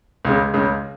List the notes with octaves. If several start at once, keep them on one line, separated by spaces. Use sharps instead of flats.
C#2 C#3 G#3
C#2 C#3 G#3